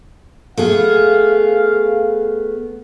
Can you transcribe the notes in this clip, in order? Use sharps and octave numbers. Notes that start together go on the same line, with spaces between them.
A3 B3 G#4 F5